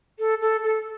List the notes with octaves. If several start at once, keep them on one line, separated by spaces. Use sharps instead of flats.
A4
A4
A4